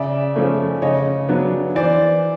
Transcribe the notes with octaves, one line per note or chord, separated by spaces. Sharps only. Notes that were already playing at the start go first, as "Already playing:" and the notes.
Already playing: C#3 D5 E5
F3 A3 C#4
C#3 C#5 D#5
F#3 B3 D4
E3 C5 D5